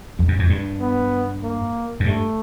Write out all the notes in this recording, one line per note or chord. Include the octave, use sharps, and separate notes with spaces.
F2
F#2
F2
G2
B3
A#3
F#2
G2 A3